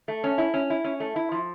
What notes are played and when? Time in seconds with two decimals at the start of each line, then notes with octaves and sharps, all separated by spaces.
0.08 A3
0.24 C#4
0.38 E4
0.54 C#4
0.70 E4
0.84 C#4
1.00 A3
1.16 E4
1.31 F3